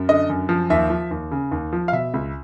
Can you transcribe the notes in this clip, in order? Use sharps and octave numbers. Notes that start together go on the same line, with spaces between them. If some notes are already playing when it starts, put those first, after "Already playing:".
Already playing: F#2
D3 D#5
F#2
F3
D#2 E5
F3
D#2
C#3
D#2
F3
F5
B2 E5
C#2